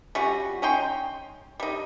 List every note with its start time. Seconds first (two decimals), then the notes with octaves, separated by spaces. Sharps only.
0.15 G3 C#4 F4 F#4
0.62 C#4 D#4 G5 C6
1.60 G3 D#4